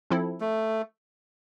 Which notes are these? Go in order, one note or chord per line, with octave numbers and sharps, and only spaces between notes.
F3 C4 E4 A4
A3